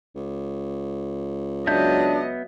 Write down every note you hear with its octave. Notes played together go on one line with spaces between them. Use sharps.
C#2
F#3 B3 D4 D#5 E5 G6